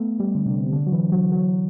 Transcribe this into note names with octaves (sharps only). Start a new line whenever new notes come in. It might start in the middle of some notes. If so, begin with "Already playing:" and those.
Already playing: A3 B3
G3
D3
C3
D3
F#3
E3
F#3
F#3